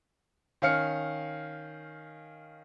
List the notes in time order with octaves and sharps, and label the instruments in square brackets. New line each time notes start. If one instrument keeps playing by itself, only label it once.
[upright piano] D#3 C#4 F5 F6 C#7